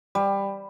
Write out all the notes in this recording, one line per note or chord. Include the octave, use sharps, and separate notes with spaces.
G3